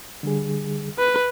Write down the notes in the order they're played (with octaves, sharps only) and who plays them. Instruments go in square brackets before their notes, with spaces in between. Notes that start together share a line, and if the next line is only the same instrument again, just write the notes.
[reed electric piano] D3 G3 G#4
[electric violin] B4